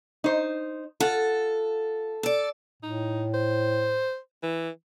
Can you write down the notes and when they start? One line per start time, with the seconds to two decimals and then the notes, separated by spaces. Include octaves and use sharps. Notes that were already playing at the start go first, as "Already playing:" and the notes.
0.24 D#4 C5
1.00 F4 A4 F#5
2.23 A4 D5
2.83 A2 D#4
3.34 C5
4.43 E3